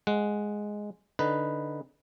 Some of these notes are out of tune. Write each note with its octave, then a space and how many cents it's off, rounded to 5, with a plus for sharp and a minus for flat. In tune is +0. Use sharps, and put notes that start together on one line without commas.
G#3 +0 F#5 -5
D3 +0 D#4 +0 B4 +0